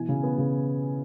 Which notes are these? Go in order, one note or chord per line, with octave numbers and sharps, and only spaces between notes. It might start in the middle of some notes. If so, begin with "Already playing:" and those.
Already playing: B2 E3 G#5
C#3
B3
C#3